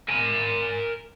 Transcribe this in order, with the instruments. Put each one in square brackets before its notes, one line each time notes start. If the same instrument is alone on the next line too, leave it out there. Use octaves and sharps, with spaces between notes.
[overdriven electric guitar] A#4 G#5